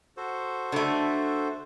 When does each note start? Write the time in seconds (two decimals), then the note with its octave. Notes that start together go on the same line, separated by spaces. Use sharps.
0.17 F#4 A4 C5
0.72 D3 A3